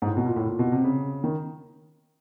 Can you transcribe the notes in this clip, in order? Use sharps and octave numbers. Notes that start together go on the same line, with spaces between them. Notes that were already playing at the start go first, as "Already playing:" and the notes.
G#2
A2
B2
A#2
A2
A#2
B2
C3
C#3
D#3